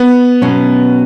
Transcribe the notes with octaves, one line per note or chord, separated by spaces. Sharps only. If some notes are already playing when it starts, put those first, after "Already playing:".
Already playing: B3
B2 F#3 C#4